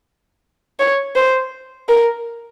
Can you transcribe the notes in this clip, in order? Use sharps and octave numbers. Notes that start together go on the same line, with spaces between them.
C#5
C5
A#4